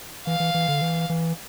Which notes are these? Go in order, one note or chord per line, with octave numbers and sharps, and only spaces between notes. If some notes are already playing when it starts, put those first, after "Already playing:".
E3 F5
E3
E3
D3
E3
E3